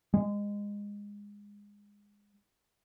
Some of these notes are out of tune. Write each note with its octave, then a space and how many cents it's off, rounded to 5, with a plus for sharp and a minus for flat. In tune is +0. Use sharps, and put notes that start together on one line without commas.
G#3 -20